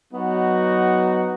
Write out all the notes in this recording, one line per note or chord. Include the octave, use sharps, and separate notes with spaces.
F#3 B3 D#4 F#4